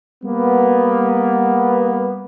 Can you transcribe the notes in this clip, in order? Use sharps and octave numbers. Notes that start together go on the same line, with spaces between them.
G3 A#3 B3